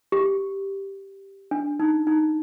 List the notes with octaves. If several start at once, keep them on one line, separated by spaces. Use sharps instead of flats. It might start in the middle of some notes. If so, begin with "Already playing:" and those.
G4
D4
D#4
D#4